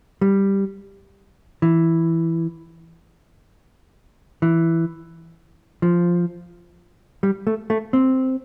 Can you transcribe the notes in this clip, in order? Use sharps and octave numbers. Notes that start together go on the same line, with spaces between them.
G3
E3
E3
F3
G3
A3
A3
C4